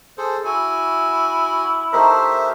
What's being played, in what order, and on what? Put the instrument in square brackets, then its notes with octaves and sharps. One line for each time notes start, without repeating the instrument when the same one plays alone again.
[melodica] G#4 A4 C5
[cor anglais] E4 [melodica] F#4 G#5
[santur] A3 D#4 A#4 [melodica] G4 C5 E5